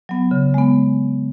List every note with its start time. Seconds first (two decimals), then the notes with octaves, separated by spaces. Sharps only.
0.09 F#3 B3
0.31 C#3
0.54 G#3 B3